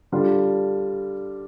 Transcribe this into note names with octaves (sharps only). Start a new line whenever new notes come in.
D3 G3 D4 F4